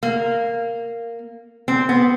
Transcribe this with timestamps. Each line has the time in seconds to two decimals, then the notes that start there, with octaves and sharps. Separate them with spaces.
0.03 A#3
1.68 C4
1.89 B3